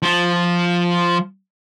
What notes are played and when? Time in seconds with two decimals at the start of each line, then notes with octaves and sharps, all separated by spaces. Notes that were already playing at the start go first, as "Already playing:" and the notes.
0.02 F3 F4